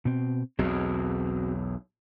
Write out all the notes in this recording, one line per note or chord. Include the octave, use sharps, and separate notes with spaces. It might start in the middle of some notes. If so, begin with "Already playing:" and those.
B2 C4
B1 E2 C4 F#4 G#4